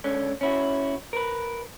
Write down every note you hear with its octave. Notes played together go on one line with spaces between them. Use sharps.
C#2 D3 C#4
C#4 E4 F#4
A#4 B4